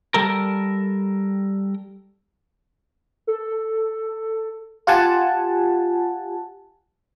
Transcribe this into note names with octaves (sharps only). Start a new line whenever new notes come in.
G3 A4 A#4
A4
F4 G4 F#5 G#5 A5